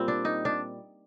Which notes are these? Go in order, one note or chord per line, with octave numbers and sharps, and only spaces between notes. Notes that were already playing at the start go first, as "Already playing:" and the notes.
Already playing: A#2 G3 C4
D4
D#4
D4